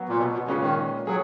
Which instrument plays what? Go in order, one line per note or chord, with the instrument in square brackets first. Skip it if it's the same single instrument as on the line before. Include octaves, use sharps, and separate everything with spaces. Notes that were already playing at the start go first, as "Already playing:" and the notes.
Already playing: [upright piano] F#3 B3 F#4
[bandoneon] A#2
B2
B2
[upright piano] A#2 G#3 C#4 F4 B4 [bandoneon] C#3
[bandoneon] D#3
[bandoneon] F#3 [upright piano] G#4